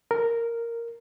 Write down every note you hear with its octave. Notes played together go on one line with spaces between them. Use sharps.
A#4